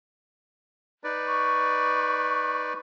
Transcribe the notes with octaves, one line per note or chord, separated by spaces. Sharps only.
D#4 B4 D5
C#6